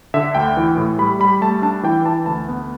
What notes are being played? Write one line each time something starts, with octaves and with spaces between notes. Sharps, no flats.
D3 E5
D2 G5
E3
A2
G3 B5
G3 B5
A3 A5
D4 A5
E3 G5
E3 A5
D2 A5
B3